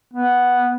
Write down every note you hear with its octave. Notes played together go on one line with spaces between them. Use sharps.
B3